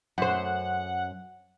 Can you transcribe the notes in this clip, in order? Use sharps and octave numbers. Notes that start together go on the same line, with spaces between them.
F#2 C5 F#5